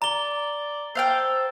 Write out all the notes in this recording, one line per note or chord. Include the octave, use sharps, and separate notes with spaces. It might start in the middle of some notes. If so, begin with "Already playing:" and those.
D5 A#5 G7
A4 C5 F5 G5